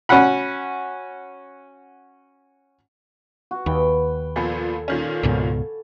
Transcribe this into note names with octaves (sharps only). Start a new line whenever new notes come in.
C#4 F#4 F#5 B5
F#4
D#2 B4 G5
A#2 F3 B3 A4 G#5
A#2 D#3 C#4
C#2 G#2 B2